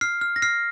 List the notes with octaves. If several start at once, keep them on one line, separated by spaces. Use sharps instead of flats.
F6 C7
F6
A#6
F6 C7